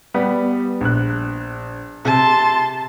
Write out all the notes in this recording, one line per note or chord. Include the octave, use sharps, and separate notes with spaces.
G3 B3 G4
A#1 F#6
C3 A5 C6